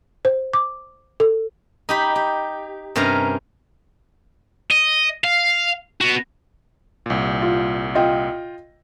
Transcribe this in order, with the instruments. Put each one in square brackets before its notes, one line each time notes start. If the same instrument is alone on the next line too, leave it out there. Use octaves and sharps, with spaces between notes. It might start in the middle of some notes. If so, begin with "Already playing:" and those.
[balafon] C5
D6
A4
[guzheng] D#4 G4 B5
G4
G2 C3 C#4 A#4 F5 A#5
[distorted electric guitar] D#5
F5
B3 F#4
[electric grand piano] C2 A#2
[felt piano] F4
F4 D#5 G5